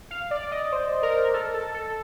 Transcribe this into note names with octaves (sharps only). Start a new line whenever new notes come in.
F5
D5
D5
D#5
C5
A#4
A4
A4
A4